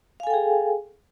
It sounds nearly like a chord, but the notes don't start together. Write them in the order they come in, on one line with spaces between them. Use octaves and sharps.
F5 G#5 A4 G5 G#4